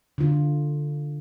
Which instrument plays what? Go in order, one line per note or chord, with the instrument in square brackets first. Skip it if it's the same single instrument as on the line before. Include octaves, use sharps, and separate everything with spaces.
[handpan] D3 F4